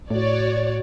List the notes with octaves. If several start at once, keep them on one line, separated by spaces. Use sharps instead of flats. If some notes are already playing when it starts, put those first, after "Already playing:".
A2 F#4 C#5 D5